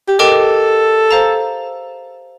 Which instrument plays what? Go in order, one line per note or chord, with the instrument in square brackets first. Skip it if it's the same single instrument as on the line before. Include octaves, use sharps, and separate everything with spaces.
[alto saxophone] G4
[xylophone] G4 A#4 D#5 G5 D6 [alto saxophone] A4
[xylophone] C5 F5 A#5